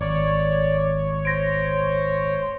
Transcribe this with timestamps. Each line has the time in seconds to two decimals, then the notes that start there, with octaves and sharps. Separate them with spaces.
0.01 G#1 C#5 D5
1.25 C5 A#6 D7